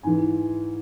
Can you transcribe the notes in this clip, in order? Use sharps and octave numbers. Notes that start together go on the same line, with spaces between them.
G#2 E3 G#5